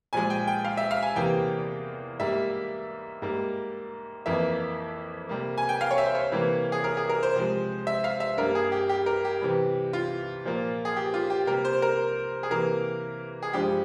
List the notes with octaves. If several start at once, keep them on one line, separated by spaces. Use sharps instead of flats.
A#2 F3 G#3 G#5
G5
G5
F5
E5
F5
G#5
E2 C3 E3 A#3 G5
G#2 G3 A#3 E5
G#2 G3 A#3
F2 E3 A#3 E5
C3 G3 A#3
G#5
G5
F5
C#5
E5
C5
C#5
C3 E3 G3 A#3
G#4
A#4
G#4
A#4
C5
C3 F3 G#3
E5
F5
E5
G2 G3 A#3 A#4
G#4
G4
G4
A#4
G4
C3 E3 G3
F4
A#2 F3 A#3
G#4
G4
F4
G4
C3 G3 A#3 A#4
C5
A#4
G#4
C3 E3 A#3 A#4
G#4
G2 F3 G#3 G4